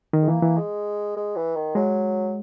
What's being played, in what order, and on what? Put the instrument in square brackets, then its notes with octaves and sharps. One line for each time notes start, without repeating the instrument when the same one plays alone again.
[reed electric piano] D#3
[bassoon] G#3
[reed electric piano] E3 [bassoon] A#3
[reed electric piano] E3
[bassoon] G#3
G#3
E3
D#3
[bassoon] F#3 [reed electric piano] G#3